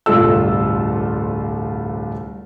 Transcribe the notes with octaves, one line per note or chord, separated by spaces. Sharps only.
D1 G1 C2 F4 A4 E6